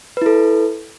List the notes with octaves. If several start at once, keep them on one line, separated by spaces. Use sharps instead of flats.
E4 A4 B4